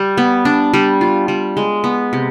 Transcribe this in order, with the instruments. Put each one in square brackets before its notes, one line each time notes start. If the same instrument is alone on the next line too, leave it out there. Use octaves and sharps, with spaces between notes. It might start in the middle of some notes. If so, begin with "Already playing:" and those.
Already playing: [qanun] G3
B3
D4
G3
F4
G3
G#3
B3
C3